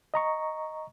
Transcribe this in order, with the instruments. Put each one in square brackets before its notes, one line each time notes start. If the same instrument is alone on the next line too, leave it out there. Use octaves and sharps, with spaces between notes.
[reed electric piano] D#5 A#5 C#6